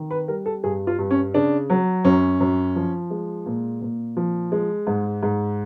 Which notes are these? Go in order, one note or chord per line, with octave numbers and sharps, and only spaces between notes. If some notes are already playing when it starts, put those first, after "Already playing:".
Already playing: D#3
B4
G3 A#4
A4
G2 G#4
F4
G2
C#4
C#3 D4
F#3
F#2 C#4
F#2
F3
G#3
A#2
A#2
F3
G#3
G#2
G#2